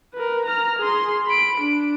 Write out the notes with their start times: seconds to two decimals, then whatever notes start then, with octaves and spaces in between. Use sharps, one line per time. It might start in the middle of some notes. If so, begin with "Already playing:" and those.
0.14 A#4 B4
0.46 A#5 F6
0.79 G#4 C6
1.27 B5 D7
1.60 D4